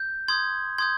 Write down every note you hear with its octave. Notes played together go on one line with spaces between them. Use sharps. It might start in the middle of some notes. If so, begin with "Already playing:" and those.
Already playing: G6
C6 D#6 G6 G#6
C6 D#6 G6 G#6